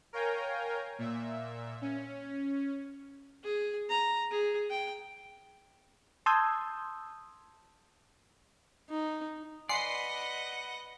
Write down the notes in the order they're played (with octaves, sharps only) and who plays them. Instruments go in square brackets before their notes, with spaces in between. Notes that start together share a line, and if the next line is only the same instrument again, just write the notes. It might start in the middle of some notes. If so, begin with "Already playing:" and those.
[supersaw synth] A#4 C#5 F5 G5 G#5 A#5
A#2 E5
C#4
[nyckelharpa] G#4
A#5
G#4
G5
[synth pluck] A5 C6 D#6 E6 G6 G#6
[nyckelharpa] D#4
[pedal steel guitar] B4 D5 [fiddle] D#5 F#5 [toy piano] G#5 C6 [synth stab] C7